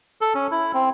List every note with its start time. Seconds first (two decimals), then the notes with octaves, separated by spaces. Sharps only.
0.21 A4
0.35 C#4
0.51 E4
0.74 C4